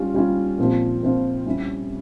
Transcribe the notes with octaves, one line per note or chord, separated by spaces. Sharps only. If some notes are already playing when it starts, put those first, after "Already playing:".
Already playing: G3 C#4 F4
G3 C#4 F4
A#2 F3 C4 F4
A#2 F3 C4 F4
G3 C#4 E4